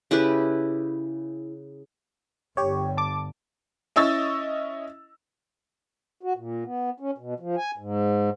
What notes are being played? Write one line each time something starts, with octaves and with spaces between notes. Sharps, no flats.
C#3 E4 G4 B4
G1 D3 G4 C#5
A5 D6
C#4 E4 D#5 C#6 E6 A6
F#4
A#2
B3
C#4
B2
F3
G#5
G#2